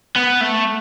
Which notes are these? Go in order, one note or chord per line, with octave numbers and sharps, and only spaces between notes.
B3
A3